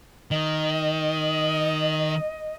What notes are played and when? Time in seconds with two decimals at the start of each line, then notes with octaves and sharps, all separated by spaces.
0.31 D#3 D#5